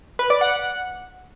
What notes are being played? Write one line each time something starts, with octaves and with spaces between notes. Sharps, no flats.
B4
D5
F#5